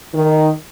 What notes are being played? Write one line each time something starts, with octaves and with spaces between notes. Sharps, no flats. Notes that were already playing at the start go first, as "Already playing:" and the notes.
D#3